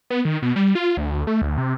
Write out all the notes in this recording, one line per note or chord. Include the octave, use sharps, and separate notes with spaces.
B3
D#3
B2
G3
F4
D2
A3
D2
C3